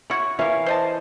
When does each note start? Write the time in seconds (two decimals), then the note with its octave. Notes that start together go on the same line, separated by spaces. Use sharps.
0.10 E4 F#4 C#5
0.39 E3 G3 A#4 C#5 F5
0.66 C5 D#5 A5